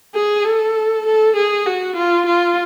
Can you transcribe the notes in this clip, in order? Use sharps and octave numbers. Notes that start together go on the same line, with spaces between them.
G#4
A4
A4
G#4
F#4
F4
F4